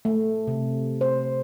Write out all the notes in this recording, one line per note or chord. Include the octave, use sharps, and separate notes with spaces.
A3
C3
C5